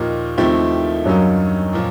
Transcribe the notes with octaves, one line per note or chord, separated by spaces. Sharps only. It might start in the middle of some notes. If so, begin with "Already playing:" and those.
Already playing: D#2 A#2 F3 A#3 D#4 G4
D#2 D#3 F3 A3 C4 E4 G4
F#2 D3 F#3 G3 A#3 D#4
A#2 F3